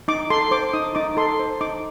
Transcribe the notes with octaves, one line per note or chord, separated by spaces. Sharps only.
D#4 D6
A4 C6
C5 D6
D#4 D#6
D#4 D6
A4 C6
C5
D#4 D6